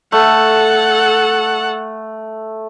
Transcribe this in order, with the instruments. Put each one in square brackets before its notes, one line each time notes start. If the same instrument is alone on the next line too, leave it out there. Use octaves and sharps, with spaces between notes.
[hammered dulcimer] A3 [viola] A4 F#5